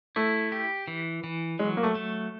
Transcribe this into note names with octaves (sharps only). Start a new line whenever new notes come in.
A3 E4
G4
E3
E3
F#3 G#3
A#3
A3
A3